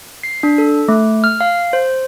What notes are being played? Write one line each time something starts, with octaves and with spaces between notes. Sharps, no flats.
C7
D4
A4
A3
F6
F5
C5